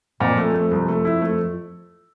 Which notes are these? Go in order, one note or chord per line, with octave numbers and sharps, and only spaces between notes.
F2 A#2 F3
A3
A3
C2
A3
E4
A3